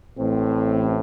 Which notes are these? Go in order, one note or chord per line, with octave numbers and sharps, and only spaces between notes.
A1 A2 C4